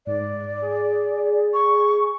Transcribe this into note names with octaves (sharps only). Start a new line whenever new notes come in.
G#2 D5
G#4
C#6